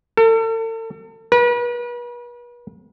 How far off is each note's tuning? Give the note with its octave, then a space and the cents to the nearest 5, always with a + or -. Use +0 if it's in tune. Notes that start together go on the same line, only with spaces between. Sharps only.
A4 +40
B4 -40